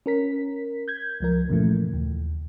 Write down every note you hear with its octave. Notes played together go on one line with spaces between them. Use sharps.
C#4 A#4 B6
G6 G#6
C#2 F3 A#4
F#2 A#2 C#3 E3 F3 A3
D#2